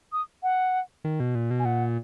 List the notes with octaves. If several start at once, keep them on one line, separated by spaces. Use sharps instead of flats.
D#6
F#5
D#3
B2
A#2
B2
G#5
A#2 F#5